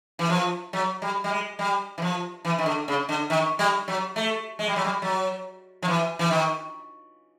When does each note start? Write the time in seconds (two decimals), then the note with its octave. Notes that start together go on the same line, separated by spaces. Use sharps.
0.19 E3
0.30 F3
0.73 F#3
1.02 G3
1.24 G3
1.30 G#3
1.59 G3
1.98 E3
2.02 F3
2.45 E3
2.58 D#3
2.66 D3
2.88 C#3
3.09 D3
3.30 D#3
3.59 G3
3.88 F#3
4.16 A3
4.59 G#3
4.68 G3
4.76 F#3
4.84 G3
5.02 F#3
5.82 F3
5.88 E3
6.19 E3
6.31 D#3